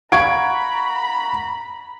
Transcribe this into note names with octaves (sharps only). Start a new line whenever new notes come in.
F5 F#5 A#5 B5 C#6 G#6 D7